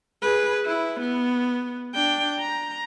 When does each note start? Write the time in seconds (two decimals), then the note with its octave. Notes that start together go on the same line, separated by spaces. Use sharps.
0.22 G#4 B4
0.65 E4
1.00 B3
1.95 D4 G5
2.39 A#5